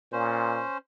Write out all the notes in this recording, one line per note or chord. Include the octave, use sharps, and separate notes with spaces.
A#2 C#4 C5